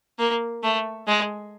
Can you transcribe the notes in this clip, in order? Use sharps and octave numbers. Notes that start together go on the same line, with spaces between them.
A#3
A3
G#3